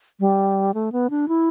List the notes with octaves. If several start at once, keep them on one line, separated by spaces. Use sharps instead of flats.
G3
A3
B3
D4
E4